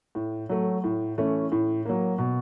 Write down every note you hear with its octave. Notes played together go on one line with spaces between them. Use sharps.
A2
F#3 A3
A2
E3 A3 C#4 E4
A2
F#3 A#3
B2